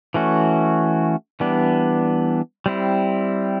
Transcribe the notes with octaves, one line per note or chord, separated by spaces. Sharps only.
E3 A3 C#4 F#4
E3 G3 B3 D4
G3 C4 E4